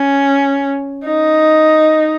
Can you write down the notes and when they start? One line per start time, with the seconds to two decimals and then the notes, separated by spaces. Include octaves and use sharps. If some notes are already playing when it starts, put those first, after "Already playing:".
Already playing: C#4
1.05 D#4